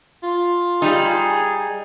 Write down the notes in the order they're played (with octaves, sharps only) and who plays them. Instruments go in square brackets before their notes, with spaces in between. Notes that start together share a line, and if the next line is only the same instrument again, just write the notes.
[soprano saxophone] F4
[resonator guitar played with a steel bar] G3 D#4 [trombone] G#4